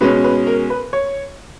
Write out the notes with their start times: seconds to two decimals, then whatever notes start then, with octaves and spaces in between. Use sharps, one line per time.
0.01 B2 G#3 C#4 B4
0.24 B4
0.47 A#4
0.70 B4
0.93 C#5